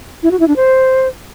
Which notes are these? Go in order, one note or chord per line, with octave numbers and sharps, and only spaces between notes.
E4
F#4
E4
D4
C5